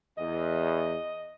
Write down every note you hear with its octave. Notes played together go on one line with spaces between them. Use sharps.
E2 D#5